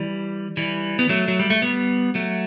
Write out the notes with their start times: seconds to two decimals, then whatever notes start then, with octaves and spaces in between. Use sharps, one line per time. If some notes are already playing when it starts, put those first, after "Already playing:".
Already playing: E3 G3
0.57 E3 G3
0.99 B3
1.09 F#3 A3
1.28 F#3
1.39 G3
1.50 A3
1.62 G3 B3
2.15 F#3 A3